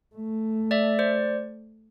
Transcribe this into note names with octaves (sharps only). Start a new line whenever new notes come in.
A3
D5 E5
C5 D5